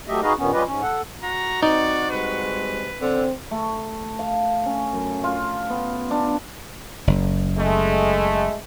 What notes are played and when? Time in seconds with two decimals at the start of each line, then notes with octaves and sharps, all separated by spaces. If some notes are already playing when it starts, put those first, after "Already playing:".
0.08 F#3 A3 G4 D#5 E5
0.22 D#4 F#4 G#4 B4 D#5 F5
0.38 G2 A#2 D#3 B3 C#4
0.53 G3 C#4 F4 G4 B4 D#5
0.66 G#2 C#4
0.82 A4 F#5
1.23 F#4 A#5
1.63 C4 D#4 D5
2.11 G3 G#3 C4 B4
3.01 D3 C4
3.51 A3
4.19 F5
4.66 C#4
4.93 F#2
5.24 F4
5.70 B3
6.11 D4
7.07 F#1
7.56 G#3 A3